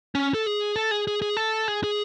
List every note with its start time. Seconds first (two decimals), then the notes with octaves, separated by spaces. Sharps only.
0.15 C#4
0.34 A4
0.46 G#4
0.76 A4
0.91 G#4
1.07 G#4
1.22 G#4
1.37 A4
1.68 G#4
1.84 G#4